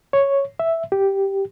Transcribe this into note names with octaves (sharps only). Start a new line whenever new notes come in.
C#5
E5
G4